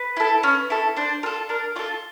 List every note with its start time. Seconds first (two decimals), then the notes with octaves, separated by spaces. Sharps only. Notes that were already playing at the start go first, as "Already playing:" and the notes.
Already playing: B4
0.17 E4 A4
0.43 C#4
0.70 E4 A4
0.97 D4 C5
1.23 F4 A#4
1.26 A4
1.49 D4 A#4
1.76 F4 A4 D5